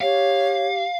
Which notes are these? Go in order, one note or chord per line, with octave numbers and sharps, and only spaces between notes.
G4 C#5 F5